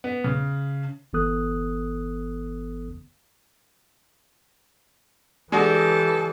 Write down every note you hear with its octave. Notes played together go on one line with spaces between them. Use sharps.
B3
C#3
G1 E3 B3 A4 D#6 F#6
E3 G#3 D4 F#4 G4 A4